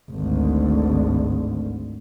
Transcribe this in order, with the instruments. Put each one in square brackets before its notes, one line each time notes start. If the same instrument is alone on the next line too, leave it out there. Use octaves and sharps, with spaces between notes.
[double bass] G#1 D2